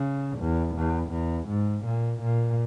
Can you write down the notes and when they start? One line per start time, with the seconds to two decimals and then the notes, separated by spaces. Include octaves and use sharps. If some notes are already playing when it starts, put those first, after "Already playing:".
Already playing: C#3
0.39 E2
0.76 E2
1.12 E2
1.49 G#2
1.85 A#2
2.22 A#2